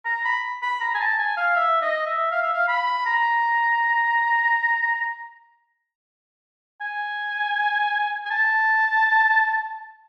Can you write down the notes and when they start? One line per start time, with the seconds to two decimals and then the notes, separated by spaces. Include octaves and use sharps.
0.06 A#5
0.25 B5
0.62 B5
0.81 A#5
0.95 G#5
1.00 A5
1.18 G#5
1.37 F5
1.56 E5
1.81 D#5
2.06 E5
2.31 F5
2.42 E5
2.53 F5
2.68 B5
3.06 A#5
6.81 G#5
8.25 G#5
8.30 A5